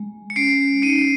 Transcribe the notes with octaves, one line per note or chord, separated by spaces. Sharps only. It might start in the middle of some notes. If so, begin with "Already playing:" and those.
Already playing: G#3
C#7
C#4 C7 D7
D#4 C#7 D#7